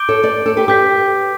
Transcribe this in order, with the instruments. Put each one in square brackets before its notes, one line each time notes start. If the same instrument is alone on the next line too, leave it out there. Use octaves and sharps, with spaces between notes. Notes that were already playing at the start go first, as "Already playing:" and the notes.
Already playing: [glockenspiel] D6 G6 D7 G7
[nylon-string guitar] A4 C#5
B4 D5
A4 C#5
G4 B4
[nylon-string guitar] G4 B4 [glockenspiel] D6 G6 B6